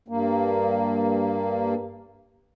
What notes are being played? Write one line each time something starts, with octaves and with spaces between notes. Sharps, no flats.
G2 A#3